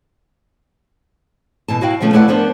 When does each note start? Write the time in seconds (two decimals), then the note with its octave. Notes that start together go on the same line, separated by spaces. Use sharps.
1.68 B2 E3 A5
1.81 E4 F#4 D#5 F5 G5
2.01 B2 D#3 F3 A3 C#4
2.13 A3 E4 B4 D5 F5 F#5
2.28 F3 B3 D4 A#4 C5